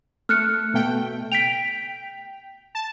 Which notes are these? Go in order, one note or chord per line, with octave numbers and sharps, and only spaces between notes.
A3 F6 F#6 C#7
B2 A3 G5
G5 B6 D7 F7
A5